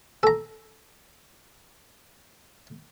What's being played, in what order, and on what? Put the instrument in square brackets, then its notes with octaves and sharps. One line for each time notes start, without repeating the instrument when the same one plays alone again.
[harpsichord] A4 A#5